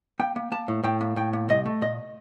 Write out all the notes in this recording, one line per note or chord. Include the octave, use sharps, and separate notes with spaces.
A#3 G5
A#3
A#3 A5
A2
A2 G5
A#3
A2 G5
A#3
C2 D#5
A3
A#2 D#5